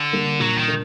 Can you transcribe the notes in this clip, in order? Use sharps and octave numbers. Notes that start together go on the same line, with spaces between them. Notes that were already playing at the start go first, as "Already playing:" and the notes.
Already playing: D3
G3 A#3 D4
A#2 F#3
D#3
A#3 D4